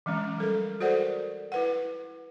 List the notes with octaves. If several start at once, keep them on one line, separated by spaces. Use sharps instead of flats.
E3 F#3 G#3 C#4
G3 A4 A#4
F#4 A4 A#4 C5 D5 F#5
E4 B4 F#5